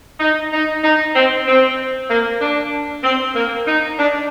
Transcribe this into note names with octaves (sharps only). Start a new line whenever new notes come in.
D#4
D#4
D#4
C4
C4
A#3
D4
C4
A#3
D#4
D4